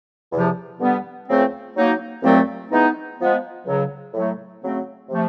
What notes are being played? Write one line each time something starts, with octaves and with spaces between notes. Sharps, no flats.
E2 C3 F3
G2 D3 G3 B3
C#2 C#3 F3 A3 C4
F#3 A#3 D#4
C2 A#2 F#3 A3 C4
E3 G#3 B3 D#4
F3 G#3 B3
C#2 C#3 F#3
A2 F#3 A3
C#3 F#3 A3 C4
C3 F3 A3